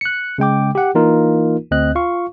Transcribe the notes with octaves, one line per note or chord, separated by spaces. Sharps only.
F#6 C#7
C#3 G#3 G5 D6
G4 F#5
E3 A#3 D#4 F4 A#4
D2 C4 D#5 F#6
F4 F5 C#6